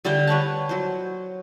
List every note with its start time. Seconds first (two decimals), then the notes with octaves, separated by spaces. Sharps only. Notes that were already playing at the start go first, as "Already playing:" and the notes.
0.05 D3 G3 E5 G5
0.27 B4 C#5 F#5 A5
0.69 F#3 C5